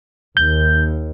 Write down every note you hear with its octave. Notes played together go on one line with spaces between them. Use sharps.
D#2 G6